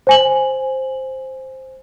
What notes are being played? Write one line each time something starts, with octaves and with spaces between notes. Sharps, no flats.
C5 G#5 F#7